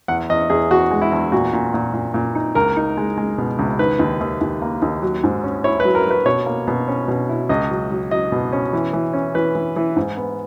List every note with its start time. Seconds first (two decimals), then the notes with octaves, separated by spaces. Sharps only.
0.08 E2 F#5
0.29 E2 D#5
0.50 E2 G#4
0.70 E2 F#4
0.91 G#3
1.01 E4
1.12 E2
1.32 A#2 F#4
1.53 A#2
1.74 A#2
1.93 A#2
2.14 A#2
2.35 D#4
2.55 C#2 A#4
2.77 D#4
2.97 G#3
3.18 G#3
3.38 B2
3.59 C#2
3.79 D#3 B4
3.99 D#2
4.21 D#2
4.41 D#2
4.62 A#3
4.82 D#2
5.02 F#3
5.24 G#2
5.44 C#4
5.64 E4 C#5
5.80 B4
5.85 F#3
5.95 A#4
6.06 F#3 B4
6.26 B2 C#5
6.46 A#3
6.68 B2
6.88 C#4
7.08 B2
7.29 E4
7.49 C#2 D#5
7.70 F#3
7.91 F#3
8.11 F#3 D#5
8.32 B2
8.52 C#4
8.73 E3
8.93 E3
9.14 C#4
9.35 E3 B4
9.55 E3
9.76 E3
9.96 G#2
10.17 B3